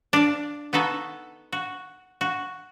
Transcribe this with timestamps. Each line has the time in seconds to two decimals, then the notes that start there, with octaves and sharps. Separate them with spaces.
0.13 D4 F5
0.73 B3 D#4 F#4 A4
1.52 F#4
2.21 F#4